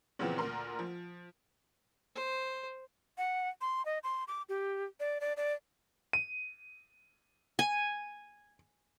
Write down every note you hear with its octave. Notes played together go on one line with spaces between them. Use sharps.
A#2 C#3 E3 F3 B3 C4
D2 A#2 A#4 C6
F3
C5
F#5
C6
D#5
C6
D6
G4
D5
D5
D5
D#7
G#5